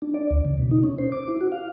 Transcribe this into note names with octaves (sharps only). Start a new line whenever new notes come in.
D4
D5
D2
C#3
B2
D#4
C#4
C5
D6
E4
F#4
F5